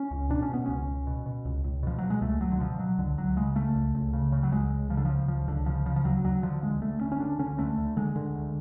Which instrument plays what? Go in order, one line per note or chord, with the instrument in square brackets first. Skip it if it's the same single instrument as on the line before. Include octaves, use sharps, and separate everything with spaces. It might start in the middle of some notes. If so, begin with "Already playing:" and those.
Already playing: [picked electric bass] C#4
C#2
B2 D4
C#4
B2 B3
C#2 C#4
C#2
B2
B2
C#2
C#2
B2 F3
B2 F#3
G#3
C#2 A3
C#2 F#3
D3
B2 F3
B2 F#3
C#2 D3
C#2 F#3
C#3 G#3
C#3 A3
C#2
C#2
C#3
C#3
F#3
C#2 G#3
C#2
C#3 F3
D3
C#3 F3
C#2 F3
C#2 D3
C#3 F3
C#3 F3
F3
D2 F#3
D2 F#3
D3 F3
D3 G#3
D2 A3
D2 C#4
C#4
D3 D4
D3 C#4
D2 A3
D2
D3 G#3
D3
D2